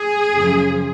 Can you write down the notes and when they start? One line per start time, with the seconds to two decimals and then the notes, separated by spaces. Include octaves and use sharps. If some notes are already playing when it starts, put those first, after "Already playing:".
Already playing: G#4
0.32 F#2 C#3 F3